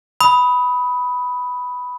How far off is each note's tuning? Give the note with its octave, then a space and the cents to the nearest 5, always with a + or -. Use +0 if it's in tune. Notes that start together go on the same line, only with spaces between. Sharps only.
B5 +0 D#6 +20